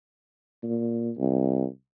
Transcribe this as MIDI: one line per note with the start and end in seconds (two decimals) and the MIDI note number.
0.63 1.11 46
1.18 1.66 36